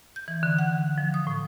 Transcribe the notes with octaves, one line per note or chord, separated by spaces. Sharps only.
G6
E3
D3
F#5
F3
D#6
A2